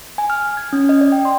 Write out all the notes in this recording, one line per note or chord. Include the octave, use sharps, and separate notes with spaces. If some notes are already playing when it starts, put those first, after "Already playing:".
G#5
F6
G#6
C#4
D#5
D5
G5
C6